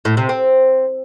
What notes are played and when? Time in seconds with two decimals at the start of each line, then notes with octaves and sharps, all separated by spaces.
0.05 A2
0.17 C3
0.29 C4